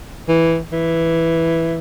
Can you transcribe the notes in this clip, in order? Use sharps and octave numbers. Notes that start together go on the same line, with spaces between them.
E3
E3